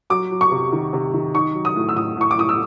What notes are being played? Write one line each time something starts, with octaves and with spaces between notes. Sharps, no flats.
F#3 D6
F#3
C#6
C3
D#3
C3
D#3
D#4 C#6
F#3
D#6
A2
E6
A2 D#6
A2 C#6
D6
A2 D#6
E6